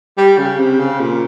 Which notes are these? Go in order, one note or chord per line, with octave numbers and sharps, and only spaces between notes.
G3
C#3
C3
C#3
A#2